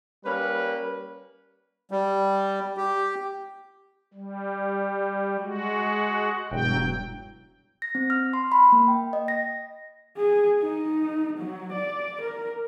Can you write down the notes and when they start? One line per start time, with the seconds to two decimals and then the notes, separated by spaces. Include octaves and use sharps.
0.24 G3 A#3 C#4 B4
1.91 G3
2.77 G4
4.14 G3
5.40 G#3 F#4
6.52 E1 G2 F#3 G5
7.82 A#6
7.95 C4
8.10 F6
8.33 C6
8.52 B5
8.72 A#3
8.88 G5
9.13 D#5
9.28 A#6
10.18 G#4
10.61 D#4
11.38 F#3
11.73 D5
12.22 A#4